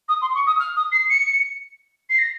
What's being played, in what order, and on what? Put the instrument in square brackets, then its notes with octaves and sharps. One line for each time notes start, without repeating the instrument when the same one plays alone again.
[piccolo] D#6
C6
C#6
D#6
F6
D#6
C7
C#7
C7
A#6